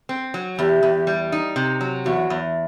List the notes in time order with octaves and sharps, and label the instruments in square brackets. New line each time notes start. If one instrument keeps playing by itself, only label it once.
[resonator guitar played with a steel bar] C4
F#3
[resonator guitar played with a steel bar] E2 [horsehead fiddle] G4
[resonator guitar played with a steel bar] E2
G3
D#4
C3
F#3
[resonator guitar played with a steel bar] E2 [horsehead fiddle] F#4
[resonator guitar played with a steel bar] E2